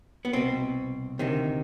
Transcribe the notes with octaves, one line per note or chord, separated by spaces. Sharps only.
B3
C2 B2 C4
D2 C3 D#3